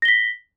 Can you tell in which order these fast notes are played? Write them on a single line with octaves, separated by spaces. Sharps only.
A#6 G7 B6